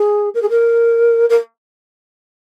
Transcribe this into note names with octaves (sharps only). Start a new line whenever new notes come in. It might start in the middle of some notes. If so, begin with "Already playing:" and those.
Already playing: G#4
A#4
G#4
A#4
A#4